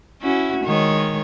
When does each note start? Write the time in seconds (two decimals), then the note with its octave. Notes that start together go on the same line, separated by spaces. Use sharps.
0.22 C#4 E4 F#4
0.64 D#3 G#3 C#5